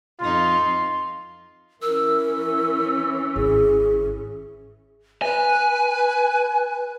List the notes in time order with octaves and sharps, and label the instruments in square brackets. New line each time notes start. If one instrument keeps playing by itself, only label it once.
[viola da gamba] F2 D#4 [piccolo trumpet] F4 [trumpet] C6
[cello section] E3 C#4 [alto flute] A#4 [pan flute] E6
[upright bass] G#1 [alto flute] G#4
[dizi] B4 [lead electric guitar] G#5